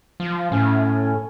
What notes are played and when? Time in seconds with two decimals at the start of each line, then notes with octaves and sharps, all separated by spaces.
0.20 F3
0.52 A2 C#4